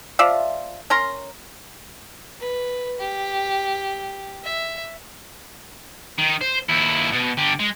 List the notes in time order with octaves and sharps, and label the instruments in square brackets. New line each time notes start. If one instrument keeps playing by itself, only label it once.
[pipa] F3 F4 D5 E5
C#4 A#4 A#5 C6
[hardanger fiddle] B4
G4
E5
[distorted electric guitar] D#3
C5
D#2 E4
B2
D3 G4
G#3